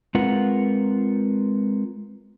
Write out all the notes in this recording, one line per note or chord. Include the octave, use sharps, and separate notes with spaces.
G#3 C4 F4 A#4 B4 F#5